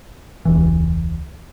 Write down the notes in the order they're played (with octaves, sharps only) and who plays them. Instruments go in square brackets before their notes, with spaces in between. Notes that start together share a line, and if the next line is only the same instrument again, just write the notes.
[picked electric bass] E1 C#2 E3